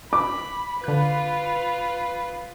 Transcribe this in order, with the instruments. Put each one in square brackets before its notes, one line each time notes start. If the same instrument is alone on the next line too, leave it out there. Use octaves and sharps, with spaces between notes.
[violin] B5 [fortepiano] D6
[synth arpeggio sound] D3 F#6 [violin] F4 B4